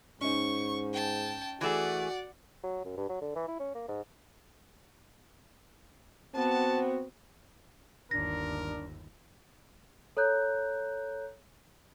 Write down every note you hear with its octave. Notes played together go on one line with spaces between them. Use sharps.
G#2 C#4 D#4 C#6
G5 A5
E3 A3 F#4 G#4 D5 F#5
F#3
F#2
G2
F#3
D3
E3
E4
C#4
A#3
G#2
B3 C4 F#4 A5
G1 D#2 D4 A#4 A#6
A4 C#5 A#5 F#6 G6